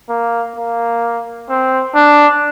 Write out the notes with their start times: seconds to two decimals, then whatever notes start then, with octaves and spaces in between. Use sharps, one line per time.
0.10 A#3
0.56 A#3
1.50 C4
1.95 D4